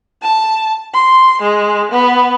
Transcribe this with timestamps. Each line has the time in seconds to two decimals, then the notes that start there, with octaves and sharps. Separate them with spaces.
0.23 A5
0.94 C6
1.42 G#3
1.92 B3